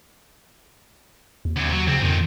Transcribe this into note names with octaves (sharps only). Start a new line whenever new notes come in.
D#2
D2 C3
F#3
D2 C#3 C4
F2 A#2 D#3